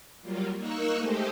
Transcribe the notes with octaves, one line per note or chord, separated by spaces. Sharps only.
F#3 G3 A#3 F4
A#3 D#4 A#4 C#6 E6 F#6
G#3 A3 G4 A4 C5 D#5